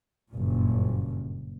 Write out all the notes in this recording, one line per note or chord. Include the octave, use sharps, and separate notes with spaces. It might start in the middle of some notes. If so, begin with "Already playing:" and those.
F#1 G2 A#2